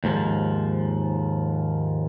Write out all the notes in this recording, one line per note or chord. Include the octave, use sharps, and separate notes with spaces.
D#2 G#2 F3